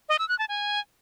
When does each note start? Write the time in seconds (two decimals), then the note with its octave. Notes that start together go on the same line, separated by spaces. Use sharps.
0.09 D#5
0.19 E6
0.29 F#6
0.39 A5
0.49 G#5